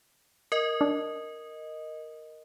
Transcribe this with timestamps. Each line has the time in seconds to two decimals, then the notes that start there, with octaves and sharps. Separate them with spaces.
0.52 A#4 D#5
0.81 D4